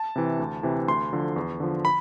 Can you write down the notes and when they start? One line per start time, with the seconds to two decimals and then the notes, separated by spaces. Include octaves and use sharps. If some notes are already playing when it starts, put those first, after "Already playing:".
Already playing: A5
0.16 C3 E3
0.39 D2
0.63 C3 E3
0.88 D2 C6
1.13 D3 F3
1.36 E2
1.60 D3 F3
1.85 B5